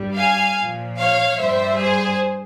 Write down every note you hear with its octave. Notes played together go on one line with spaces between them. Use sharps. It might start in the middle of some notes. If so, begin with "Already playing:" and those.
Already playing: G2 G3
F5 G#5
A#2 F3
C#5 F5
G2 G3 C5 E5
G#4 C5